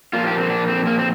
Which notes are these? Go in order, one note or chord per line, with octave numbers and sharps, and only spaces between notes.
A#2 F3 A#3 F4
G4
C4
D4
C4
A#3
C4